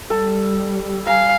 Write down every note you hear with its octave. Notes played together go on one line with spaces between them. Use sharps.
G3 A4
F5 G#5 A#5